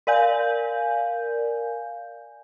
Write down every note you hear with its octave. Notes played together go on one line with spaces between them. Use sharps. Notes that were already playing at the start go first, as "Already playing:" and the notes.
A#4 D5 F5 G#5 G6